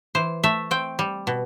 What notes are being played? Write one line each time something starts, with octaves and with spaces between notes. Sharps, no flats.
E3 C5
A3 E5
C4 G5
G3
B2